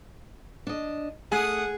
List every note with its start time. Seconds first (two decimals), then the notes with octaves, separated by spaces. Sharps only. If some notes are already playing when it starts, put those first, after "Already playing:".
0.67 D4 D#5
1.32 A3 G#4 F#5 D#6